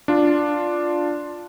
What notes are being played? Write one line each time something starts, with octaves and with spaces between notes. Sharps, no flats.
D4 F4